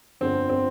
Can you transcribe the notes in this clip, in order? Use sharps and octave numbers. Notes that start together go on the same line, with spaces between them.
G1 F2 D3 C4
C4